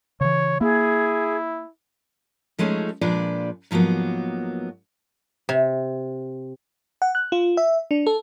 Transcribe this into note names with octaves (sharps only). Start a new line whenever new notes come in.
C#3 E3 C#5
A#3 E4 G#4
F3 G#3 A3 C#4 D#4
A#2 F3 G#3 D4 B4 D5
G#2 F3 F#3 A#3 B3
C3
F#5
F#6
F4
E5
D4
A4